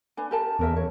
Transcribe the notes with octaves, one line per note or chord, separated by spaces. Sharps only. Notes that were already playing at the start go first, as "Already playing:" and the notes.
D4 B4 G#5
G4 A#4 A5
E2 C#4 A#4 E5
C#5